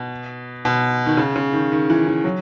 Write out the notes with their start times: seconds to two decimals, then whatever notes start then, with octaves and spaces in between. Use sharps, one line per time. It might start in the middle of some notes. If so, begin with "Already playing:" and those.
Already playing: B2
0.65 B2
1.06 D#3
1.17 C#3
1.36 C#3
1.53 D#3
1.72 D#3
1.90 E3
2.07 E3
2.24 F#3